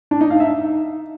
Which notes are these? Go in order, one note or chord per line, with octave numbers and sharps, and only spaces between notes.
D4
D#4
F5
E5
D#4